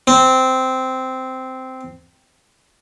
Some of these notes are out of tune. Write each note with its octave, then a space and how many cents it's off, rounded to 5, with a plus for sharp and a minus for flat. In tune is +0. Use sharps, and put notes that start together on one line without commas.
C4 -10